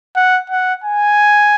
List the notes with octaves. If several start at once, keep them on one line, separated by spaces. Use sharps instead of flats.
F#5
F#5
G#5